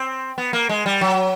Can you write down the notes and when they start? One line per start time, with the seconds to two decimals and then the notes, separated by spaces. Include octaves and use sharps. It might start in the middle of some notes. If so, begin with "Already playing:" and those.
Already playing: C4
0.38 B3
0.53 A#3
0.69 G#3
0.86 G3
1.01 F#3